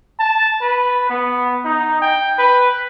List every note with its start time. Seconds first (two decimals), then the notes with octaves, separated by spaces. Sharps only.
0.19 A5
0.61 B4
1.09 B3
1.64 D#4
2.02 G5
2.38 B4